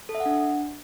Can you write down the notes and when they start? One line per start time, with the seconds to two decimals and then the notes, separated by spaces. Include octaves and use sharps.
0.09 A4
0.15 E5
0.20 F#5
0.26 D4